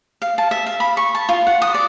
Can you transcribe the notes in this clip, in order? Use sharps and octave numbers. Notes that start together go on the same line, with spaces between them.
F5
A5
E5
F5
B5
C#6
A5
F4
F#5
D#6
D5